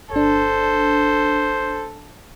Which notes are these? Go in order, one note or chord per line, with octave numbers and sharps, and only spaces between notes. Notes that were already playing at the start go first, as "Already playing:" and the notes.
G1 D4 A4 C5